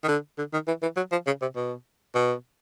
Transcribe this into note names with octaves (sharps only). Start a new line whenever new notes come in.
D#3
D3
D3
D#3
E3
E3
F#3
F3
C#3
C3
B2
B2